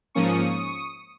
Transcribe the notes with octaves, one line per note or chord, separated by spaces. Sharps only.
G#2 F3 A#3 C#4 C#6 D#6